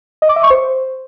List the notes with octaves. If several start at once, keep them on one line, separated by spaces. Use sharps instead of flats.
D#5
D6
E5
C#6
C5